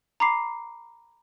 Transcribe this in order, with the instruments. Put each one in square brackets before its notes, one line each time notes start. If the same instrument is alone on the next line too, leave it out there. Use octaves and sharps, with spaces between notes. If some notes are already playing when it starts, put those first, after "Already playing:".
[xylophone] A#5 B5 D6 C7